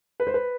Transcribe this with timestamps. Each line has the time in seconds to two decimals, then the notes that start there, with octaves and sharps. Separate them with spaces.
0.20 B4
0.27 C5
0.34 B4